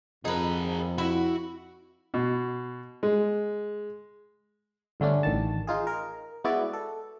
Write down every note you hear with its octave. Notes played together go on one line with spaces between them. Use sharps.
F2 D#4 G#4 A#4 B4
E4 F#4
B2
G#3
G2 D3 A3 C#4 D4
A1 D#3 A5
D#4 F4 G#4
A#4
G#3 B3 E4 F#4 D5
A4